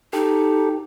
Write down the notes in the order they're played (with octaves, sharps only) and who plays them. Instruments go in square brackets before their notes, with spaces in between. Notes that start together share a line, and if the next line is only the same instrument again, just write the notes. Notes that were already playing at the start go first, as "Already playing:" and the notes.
[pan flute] D#4 [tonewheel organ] G4 A4